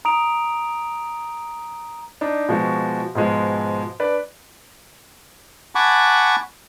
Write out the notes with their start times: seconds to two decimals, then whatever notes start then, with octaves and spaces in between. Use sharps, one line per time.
0.05 A#5 D#6 D7 F7
2.21 D4 D#4
2.48 B2 F3 G#3 F#4
3.15 G#2 B2 F3 G#3
4.00 D4 B4 D5
5.75 F#5 G#5 A5 B5 C#6 D6